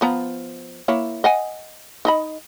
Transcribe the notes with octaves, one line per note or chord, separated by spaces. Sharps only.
F3 B3 A#5
A#3 E4 C#5
D#5 F#5 G#5
D#4 D#5 B5